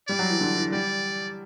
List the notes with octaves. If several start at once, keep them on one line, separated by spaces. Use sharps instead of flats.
G3 D5
F#3
E3
D3
E3
G3 D5